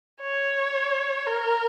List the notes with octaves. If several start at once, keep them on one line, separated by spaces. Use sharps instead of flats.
C#5
A#4